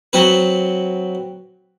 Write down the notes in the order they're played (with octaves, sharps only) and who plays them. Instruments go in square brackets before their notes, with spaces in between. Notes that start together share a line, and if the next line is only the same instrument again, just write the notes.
[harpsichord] F#3 C4 B4